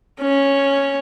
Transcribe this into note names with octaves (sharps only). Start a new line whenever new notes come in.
C#4